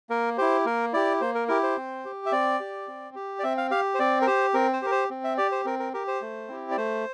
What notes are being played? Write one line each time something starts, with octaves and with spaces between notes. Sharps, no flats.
A#3 A#4
E4 G4 C5
A#3 A#4
E4 G4 D5
A#3 C5
A#4
E4 G4 A#4
C5
C4
G4
E5
C4 D5
G4
C4
G4
D5
C4 E5
F5
G4 F5
C5
C4 D5
A#4
G4 C5
C4 A#4
C5
G4 A#4
C5
C4
E5
G4 D5
C5
C4 A#4
A#4
G4 A#4
C5
A3
C4 E4 G4
D5
A3 C5